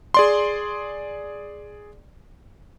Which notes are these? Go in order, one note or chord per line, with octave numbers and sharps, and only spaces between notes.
G#4 D5 C6